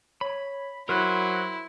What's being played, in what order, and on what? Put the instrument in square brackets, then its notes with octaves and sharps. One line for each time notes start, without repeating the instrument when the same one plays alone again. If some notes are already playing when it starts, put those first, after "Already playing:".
[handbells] C#5 [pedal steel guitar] B5
[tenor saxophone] F#3 [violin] E4 [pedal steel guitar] A#4 C5 F#6 [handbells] C6